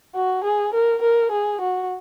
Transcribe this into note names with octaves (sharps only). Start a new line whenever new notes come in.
F#4
G#4
A#4
A#4
G#4
F#4